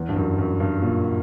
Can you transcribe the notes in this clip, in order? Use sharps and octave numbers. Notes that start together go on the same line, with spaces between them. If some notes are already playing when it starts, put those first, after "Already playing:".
Already playing: E2
G2
F#2
F#2
G2
A#2